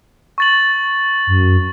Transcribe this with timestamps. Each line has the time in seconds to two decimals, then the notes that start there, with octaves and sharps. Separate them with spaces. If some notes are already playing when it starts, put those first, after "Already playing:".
0.38 C#6 A6 F#7
1.27 F#2